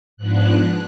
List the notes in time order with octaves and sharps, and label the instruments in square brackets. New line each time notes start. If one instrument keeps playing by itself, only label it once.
[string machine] G#2 F3 B3 D4 F#6